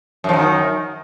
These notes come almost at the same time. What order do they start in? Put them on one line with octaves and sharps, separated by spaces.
F#2 F3 D#3